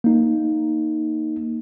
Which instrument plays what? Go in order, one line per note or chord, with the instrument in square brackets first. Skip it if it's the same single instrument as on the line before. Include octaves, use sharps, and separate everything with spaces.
[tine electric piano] A#3 D#4